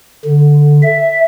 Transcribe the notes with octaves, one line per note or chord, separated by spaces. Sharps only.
D3
E5